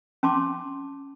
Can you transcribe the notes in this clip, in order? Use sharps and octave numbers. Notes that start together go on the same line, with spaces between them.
C#4 A5 C6 D6